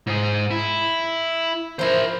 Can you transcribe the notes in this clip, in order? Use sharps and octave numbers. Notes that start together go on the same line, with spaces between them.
G#2 G#4
E4
F3 E4 A#4 C5